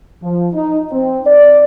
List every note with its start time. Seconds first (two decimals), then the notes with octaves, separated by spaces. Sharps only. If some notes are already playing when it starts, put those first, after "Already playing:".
0.23 F3
0.53 D#4
0.91 C4
1.26 D5